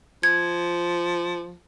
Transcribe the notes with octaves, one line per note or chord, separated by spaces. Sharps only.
F3 G#6